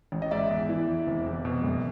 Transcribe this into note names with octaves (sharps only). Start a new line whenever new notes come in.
A1
D#5
G#2 D5 E5
E2
E3
E2
F1
E2
B2
F#1